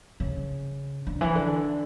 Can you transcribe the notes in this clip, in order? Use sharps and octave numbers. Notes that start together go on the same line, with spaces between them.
C#3
D3
E3
D3